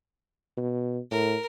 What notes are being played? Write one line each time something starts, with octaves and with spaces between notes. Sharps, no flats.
B2
A2 A#4